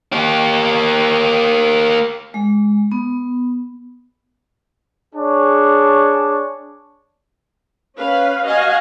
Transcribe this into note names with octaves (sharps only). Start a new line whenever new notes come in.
A#3 G4
G#3
B3
D4 G#4 C#5
C#4 B4 F5
F#4 D#5 F5 G#5